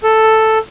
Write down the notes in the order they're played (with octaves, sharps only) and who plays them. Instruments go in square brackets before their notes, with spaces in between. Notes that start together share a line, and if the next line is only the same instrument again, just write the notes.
[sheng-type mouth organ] A4